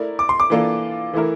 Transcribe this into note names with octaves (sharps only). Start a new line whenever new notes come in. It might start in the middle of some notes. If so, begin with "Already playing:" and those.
Already playing: A3 E4 A#4 D5
D6
C6
D6
E3 A#3 D4 F4 A4
E3 A3 E4 A#4